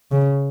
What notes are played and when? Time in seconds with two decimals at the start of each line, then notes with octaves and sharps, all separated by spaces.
0.11 C#3